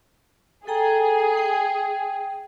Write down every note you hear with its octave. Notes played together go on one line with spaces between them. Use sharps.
G#4 A4 G5 A#5
G5